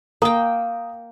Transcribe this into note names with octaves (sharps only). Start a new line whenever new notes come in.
A#3 A#4 G5 A#5 D#6